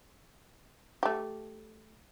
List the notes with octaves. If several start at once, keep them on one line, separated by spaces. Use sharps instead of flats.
A3 G4